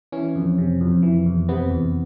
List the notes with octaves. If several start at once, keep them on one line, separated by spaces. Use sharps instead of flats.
E3 C#4
F2
C3
F2
E3
E2
C3 B3
E2